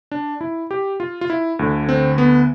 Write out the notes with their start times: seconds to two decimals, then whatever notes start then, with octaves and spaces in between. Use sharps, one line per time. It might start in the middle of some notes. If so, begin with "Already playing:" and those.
0.12 D4
0.41 E4
0.71 G4
1.00 F4
1.21 F4
1.30 E4
1.59 D2 D3
1.89 C4
2.18 B3